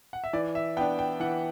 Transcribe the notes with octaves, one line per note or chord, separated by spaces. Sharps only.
F#5
E5
E3 D5
E5
B3 D4 G5
G5
E3 F#5